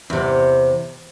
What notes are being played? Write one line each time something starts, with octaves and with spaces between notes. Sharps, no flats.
E2 C3